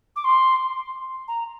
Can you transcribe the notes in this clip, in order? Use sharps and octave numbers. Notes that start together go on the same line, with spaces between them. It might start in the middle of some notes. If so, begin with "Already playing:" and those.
D6
C6
A#5